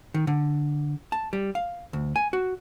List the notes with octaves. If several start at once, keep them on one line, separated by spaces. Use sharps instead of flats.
D#3
D3
A5
G3
F5
D2
G#5
F#4